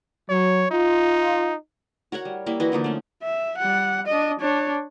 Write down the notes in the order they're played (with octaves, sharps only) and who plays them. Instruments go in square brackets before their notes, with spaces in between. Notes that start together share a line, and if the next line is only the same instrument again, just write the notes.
[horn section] F#3 [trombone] C#5
[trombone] D#4 [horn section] F4
[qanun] F#4 A#4 C#5 F#5
G3
G3 A#3 E4
E3 E4 F#4 D#5
D3 F3 A#3 D#4
A3 C#4
[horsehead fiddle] E5
G3 F#5
D4 D#5
D4 C#5